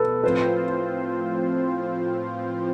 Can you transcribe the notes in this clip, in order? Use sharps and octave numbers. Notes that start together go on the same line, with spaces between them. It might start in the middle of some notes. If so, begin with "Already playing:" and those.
Already playing: B2 A4 B4
A2 F3 C4 F4 B4 C5